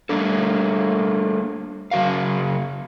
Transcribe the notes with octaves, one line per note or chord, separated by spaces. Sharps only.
G3 A3 A#3 D4 A4
C#3 F#3 F#4 A#4 F5